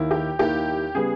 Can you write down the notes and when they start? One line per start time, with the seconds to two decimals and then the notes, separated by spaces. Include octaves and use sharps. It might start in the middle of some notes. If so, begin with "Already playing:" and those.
Already playing: D#2 D#3 A#3 E4
0.11 G4
0.39 D#2 D#3 A#3 E4 G4
0.95 C#3 G3 B3 G#4